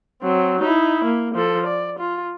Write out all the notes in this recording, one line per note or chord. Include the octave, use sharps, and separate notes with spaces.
F#3 C4
D#4 E4
A#3
F3 A4
D5
F4